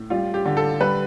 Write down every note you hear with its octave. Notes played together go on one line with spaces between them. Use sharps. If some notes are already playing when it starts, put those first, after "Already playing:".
Already playing: A2
G3 F4
G4
D3
A4
G3 B4